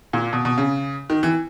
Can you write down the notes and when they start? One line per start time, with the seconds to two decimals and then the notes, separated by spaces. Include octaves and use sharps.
0.13 A#2
0.33 B2
0.45 B2
0.58 C#3
1.10 D#3
1.23 E3